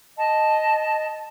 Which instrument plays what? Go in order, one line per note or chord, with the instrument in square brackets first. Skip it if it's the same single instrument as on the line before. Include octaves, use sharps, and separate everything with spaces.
[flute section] D#5 A5